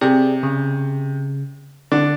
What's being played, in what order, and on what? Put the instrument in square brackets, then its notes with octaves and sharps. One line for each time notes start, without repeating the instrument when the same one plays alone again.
[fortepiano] C3 [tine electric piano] G#4 D5
[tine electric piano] C#3
[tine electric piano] D3 F#5 [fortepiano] D4